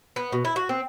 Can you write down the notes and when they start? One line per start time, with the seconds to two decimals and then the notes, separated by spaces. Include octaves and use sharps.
0.16 B3
0.32 B2
0.45 E4
0.56 F#4
0.69 C4